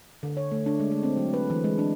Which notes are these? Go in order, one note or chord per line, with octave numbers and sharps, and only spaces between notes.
D3
C#5
A3
D4
G#3
A3
C4
F#3
B4
E3
G#3
D4